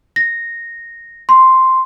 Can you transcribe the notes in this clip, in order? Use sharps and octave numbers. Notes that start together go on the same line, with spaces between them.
A#6
C6